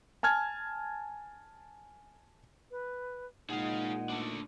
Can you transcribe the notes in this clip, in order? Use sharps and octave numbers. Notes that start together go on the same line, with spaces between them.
G#5 A5 F6 G#6
B4
A#2 G#3 D#4 G#4 F5 F#5
A3 D4